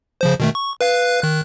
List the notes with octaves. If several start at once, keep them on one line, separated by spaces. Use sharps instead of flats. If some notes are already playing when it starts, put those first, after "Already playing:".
C#3 F3 C5
B2 D#3 A3
C#6
B4 F5 F#6
D#3 F#6